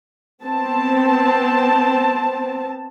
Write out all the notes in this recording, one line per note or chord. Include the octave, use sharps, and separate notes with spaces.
B3 C4 A5